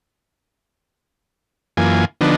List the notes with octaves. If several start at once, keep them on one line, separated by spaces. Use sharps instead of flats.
F#2 E3 A#3 F4 G#5
D3 F3 B3 D4 D#4